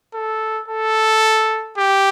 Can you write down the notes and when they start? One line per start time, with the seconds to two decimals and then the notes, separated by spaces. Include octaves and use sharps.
0.14 A4
0.68 A4
1.78 G4